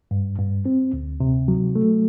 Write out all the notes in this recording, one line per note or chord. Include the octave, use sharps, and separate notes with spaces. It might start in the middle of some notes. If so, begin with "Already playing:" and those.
G2
G2
C4
D2
C3
F#3
A3